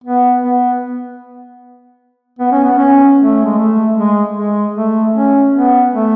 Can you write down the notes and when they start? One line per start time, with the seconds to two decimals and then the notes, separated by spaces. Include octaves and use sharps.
0.04 B3
0.42 B3
2.39 B3
2.52 C#4
2.64 B3
2.78 C#4
3.19 A3
3.45 G#3
3.58 A3
3.97 G#3
4.37 G#3
4.75 A3
5.14 C#4
5.54 B3
5.94 A3